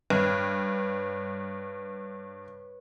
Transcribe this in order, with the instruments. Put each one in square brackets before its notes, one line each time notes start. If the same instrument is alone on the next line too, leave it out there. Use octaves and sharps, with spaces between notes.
[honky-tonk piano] G2 [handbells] B4 C#5